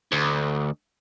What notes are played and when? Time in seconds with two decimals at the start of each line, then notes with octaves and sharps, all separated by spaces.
0.12 D2